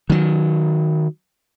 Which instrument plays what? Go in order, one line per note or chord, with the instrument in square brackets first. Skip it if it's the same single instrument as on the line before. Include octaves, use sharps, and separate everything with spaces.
[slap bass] D#3 F#3